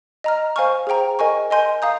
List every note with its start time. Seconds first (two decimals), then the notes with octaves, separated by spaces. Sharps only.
0.24 D#5 A#5 F6
0.56 C5 F5 G#5 C#6 F6
0.87 G#4 C5 G5 A#5
1.19 A#4 D#5 G#5 C#6
1.50 A#4 D#5 G#5 C6 G6
1.82 F5 A#5 D#6 G6